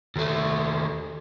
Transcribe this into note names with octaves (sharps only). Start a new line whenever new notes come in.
D#2 A3